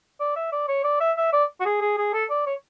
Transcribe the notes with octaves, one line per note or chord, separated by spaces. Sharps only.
D5
E5
D5
C#5
D5
E5
E5
D5
F#4
G#4
G#4
G#4
A4
D5
C#5